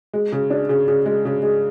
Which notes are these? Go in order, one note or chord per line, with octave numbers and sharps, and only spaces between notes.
G#3
C#3
D4
C#3
C#3
G#3
C#3
G#3